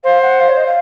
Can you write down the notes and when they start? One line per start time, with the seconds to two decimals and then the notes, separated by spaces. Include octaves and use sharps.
0.04 C5 F5
0.21 F#5
0.39 F5
0.48 C#5
0.57 D#5
0.66 F5